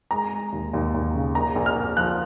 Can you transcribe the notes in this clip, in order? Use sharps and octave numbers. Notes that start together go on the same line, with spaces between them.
G#3 A#5
G#3
D#2
D#2
D#2
C#3
A#1 A#5
A#1
F6
A#1
F3 F#6